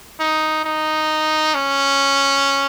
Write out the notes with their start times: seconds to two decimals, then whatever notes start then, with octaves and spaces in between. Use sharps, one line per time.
0.20 D#4
0.64 D#4
1.55 C#4